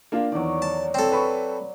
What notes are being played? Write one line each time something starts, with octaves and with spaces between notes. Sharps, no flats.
A#3 D4 F4
E2 D#3 F#3 D5
A5
C4 A4
B4 B5 C#6